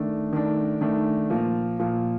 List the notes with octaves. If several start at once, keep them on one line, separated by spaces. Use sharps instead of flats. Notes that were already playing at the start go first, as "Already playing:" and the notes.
Already playing: D#3 A3 D4
D#3 A3 D4
D#3 A3 D4
A#2 F3 A#3
A#2 F3 A#3